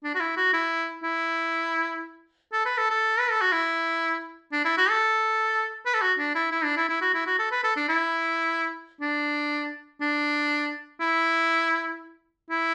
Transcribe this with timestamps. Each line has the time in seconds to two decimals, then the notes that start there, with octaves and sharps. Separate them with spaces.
0.04 D4
0.15 F#4
0.20 E4
0.37 F#4
0.53 E4
1.03 E4
2.53 A4
2.66 B4
2.78 A4
2.90 A4
3.19 B4
3.30 A4
3.41 F#4
3.52 E4
4.52 D4
4.65 E4
4.78 F#4
4.90 A4
5.86 B4
5.94 A4
6.02 F#4
6.18 D4
6.35 E4
6.52 E4
6.64 D4
6.77 E4
6.89 E4
7.01 F#4
7.14 E4
7.27 F#4
7.39 A4
7.52 B4
7.64 A4
7.76 D4
7.89 E4
9.01 D4
10.01 D4
11.01 E4
12.50 E4